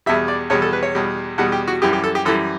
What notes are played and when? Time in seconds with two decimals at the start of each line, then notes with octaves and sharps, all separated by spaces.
0.06 E2 B2 G3 E5
0.28 D5
0.50 E2 B2 G3 C#5
0.62 A4
0.73 B4
0.83 C#5
0.95 E2 B2 G3
1.38 E2 B2 G3 F#5
1.52 G4
1.68 F#4
1.82 F#2 E3 G3 G4
1.93 G4
2.04 A4
2.15 G4
2.25 F#2 E3 G3 A4